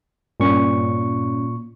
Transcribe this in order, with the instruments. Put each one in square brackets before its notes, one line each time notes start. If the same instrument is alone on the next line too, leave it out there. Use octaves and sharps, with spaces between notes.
[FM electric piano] G2 C#4 [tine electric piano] A#2 C#6